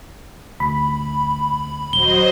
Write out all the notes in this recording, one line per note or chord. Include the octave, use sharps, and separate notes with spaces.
D2 B5
D#1 F#3 C5 D#5 G7